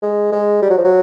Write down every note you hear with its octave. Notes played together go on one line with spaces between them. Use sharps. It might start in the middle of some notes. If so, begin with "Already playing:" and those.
G#3
G#3
G3
F#3
F3
F#3